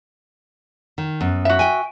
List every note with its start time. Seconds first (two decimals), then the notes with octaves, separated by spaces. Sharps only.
0.98 D#3
1.20 F#2 B3
1.45 F#4 E5
1.59 G5 G#5